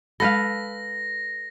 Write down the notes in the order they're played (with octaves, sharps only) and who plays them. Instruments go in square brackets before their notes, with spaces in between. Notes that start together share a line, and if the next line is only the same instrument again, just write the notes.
[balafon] G#3 B5 [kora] A4 B4 F5 [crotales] A#6